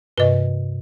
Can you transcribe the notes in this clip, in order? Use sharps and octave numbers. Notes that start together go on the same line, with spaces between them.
G2 C3 B4 D#5